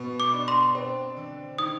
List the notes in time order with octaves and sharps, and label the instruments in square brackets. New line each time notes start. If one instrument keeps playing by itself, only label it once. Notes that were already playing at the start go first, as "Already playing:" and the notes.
Already playing: [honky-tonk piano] B2 B3
[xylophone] D6
[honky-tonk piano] D4
[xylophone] C6
[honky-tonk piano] C4
D3
[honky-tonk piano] D#3 [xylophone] D#6